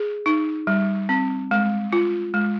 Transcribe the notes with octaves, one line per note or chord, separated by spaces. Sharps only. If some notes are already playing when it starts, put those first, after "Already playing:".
Already playing: G#4
D#4
G3
C4
G#3
F4
G#3